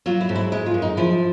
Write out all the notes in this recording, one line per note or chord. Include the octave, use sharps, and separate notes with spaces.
F#3 F4
E4
G#2
E4
G#3 E4
F4
F#2
D#4
F3 E4